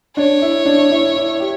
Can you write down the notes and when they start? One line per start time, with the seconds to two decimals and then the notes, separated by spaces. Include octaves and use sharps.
0.16 D4 C#5
0.42 E4
0.66 D4
0.92 E4
1.16 E4
1.40 G4